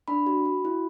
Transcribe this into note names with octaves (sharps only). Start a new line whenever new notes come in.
D4 B5
F#4
F#4
E4